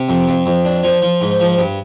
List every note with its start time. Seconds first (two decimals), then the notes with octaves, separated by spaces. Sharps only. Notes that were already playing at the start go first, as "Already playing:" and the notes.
Already playing: C3
0.09 F2
0.28 F2
0.46 F2
0.65 D4
0.83 F3
1.02 F3
1.21 G#2
1.40 F3
1.58 G2